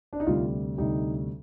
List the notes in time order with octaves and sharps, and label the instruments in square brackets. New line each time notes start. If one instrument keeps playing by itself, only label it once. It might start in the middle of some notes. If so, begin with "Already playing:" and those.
[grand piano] D4
D#4
D2 C3 G3 F4
D2 C3 G3 D#4